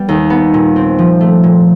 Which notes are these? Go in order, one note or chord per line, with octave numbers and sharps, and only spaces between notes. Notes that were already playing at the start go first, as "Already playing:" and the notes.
Already playing: G3 B3
D#2
B3
A#2
C4
F3
A3
A#2